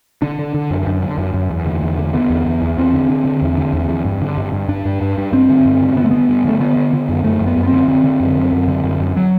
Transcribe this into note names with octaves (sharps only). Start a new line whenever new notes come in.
D3 D4
D3
D3
F#2
F#2
D3
F#2
F#2
E2
D3
E2
D3
D3 B3
E2
E2
E2
E2 C4
D3
D3
D3
E2
D3
E2
E2
G2
D3
G2
G2
G2 D4
G2
G2
G2
G2 C4
D3
G2
D3
D3 B3
A3
G2 B3
G2
D3 A3
D3 B3
D3
D3
F#2
F#2 A3
F#2
B3
F#2
B3
D3 C4
D3 C4
D3
F#2
F#2
F#2
D3
F#2
F#2
F#3